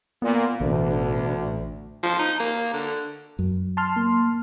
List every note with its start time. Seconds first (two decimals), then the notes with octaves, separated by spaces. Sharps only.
0.22 A#2 B3
0.60 A1 D2 B2 D4
2.03 F3
2.19 D#4
2.40 A#3
2.74 D3
3.39 F#2
3.77 A5 C6 F6
3.96 A#3